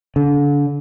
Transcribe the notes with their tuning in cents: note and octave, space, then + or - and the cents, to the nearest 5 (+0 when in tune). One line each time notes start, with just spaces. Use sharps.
D3 -35